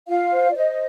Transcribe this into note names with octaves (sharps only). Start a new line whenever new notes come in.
F4 F5
C5
D5
C5 D#5